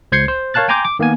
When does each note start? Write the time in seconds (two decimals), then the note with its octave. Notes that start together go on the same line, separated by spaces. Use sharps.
0.12 C#2 C5 G6 G#6 C7 C#7
0.28 C5
0.54 A#4 C#5 F5 A5 F#6 A6
0.69 G5 G#5 A#5 C6 D6 G6
0.85 D6
0.99 D#3 A#3 B3 G#5